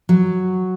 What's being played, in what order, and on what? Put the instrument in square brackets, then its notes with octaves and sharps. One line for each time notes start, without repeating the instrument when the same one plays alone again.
[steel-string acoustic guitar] F#3